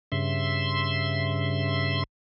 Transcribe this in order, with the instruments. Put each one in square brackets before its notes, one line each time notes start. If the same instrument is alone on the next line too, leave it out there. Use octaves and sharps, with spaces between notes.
[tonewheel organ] G2 C#3 E5 C6